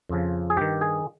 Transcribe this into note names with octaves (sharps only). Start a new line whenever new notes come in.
F2 C#3 F3
G#4
G2 D#3 G4
G#4